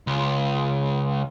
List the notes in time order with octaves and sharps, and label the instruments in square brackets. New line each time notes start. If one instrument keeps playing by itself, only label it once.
[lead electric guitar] C#2